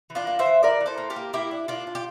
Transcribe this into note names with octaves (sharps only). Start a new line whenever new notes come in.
E3
D4 F4
A#3
C5 E5
E3
E3 A#4 D5
E3
A4 C5
A#3
G4 A#4
A#3
A#3 E4 G4
D4
A#3 D4 F4
D4
G4